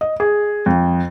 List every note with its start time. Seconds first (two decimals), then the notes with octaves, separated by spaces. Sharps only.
0.01 D#5
0.20 G#4
0.66 F2